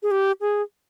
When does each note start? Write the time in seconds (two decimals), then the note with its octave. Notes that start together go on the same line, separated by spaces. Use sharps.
0.03 G#4
0.11 G4
0.41 G#4